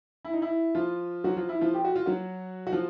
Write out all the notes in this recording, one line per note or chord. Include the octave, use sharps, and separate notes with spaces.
E4
D#4
E4
F3 F4
F#3 F#4
F3 F4
E4
F3 F4
G4
F#4
F4
F#3 F#4
F#4
F3 F4